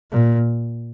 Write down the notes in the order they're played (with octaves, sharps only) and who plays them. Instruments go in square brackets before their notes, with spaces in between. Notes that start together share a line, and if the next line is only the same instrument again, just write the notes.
[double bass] A#2